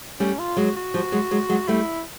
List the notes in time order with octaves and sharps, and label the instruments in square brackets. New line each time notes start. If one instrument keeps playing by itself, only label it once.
[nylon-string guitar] G3 A3 [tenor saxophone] C#4
[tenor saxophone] F4
[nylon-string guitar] F#3 G#3 [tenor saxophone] F#4
[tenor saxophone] F#4
[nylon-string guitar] F3 G3
F#3 G#3
F#3 G#3
F#3 G#3
[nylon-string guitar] G3 A3 [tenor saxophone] E4